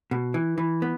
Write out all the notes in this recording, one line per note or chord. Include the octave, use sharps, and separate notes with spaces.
B2
E3
E3
B3